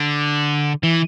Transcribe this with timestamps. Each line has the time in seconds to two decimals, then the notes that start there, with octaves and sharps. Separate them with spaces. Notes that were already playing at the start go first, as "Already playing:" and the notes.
Already playing: D3
0.83 E3